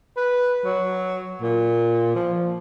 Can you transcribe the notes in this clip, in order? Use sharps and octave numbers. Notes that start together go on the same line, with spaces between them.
B4
F#3
A#2
F3